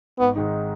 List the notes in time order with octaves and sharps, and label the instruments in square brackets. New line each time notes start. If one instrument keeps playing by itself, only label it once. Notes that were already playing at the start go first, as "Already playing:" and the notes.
[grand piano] G#1 [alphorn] B3
[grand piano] G#2 D#3 G#3 D#4